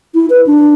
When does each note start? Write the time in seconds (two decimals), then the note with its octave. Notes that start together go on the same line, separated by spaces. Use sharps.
0.15 E4
0.30 B4
0.47 D4